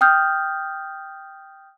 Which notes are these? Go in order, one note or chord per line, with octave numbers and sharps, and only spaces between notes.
G5 D#6 F6 G6